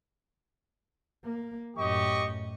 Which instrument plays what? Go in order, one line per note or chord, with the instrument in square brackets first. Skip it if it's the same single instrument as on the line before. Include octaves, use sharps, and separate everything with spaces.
[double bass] A#3
[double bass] F#2 A2 [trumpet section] G4 D#5 C#6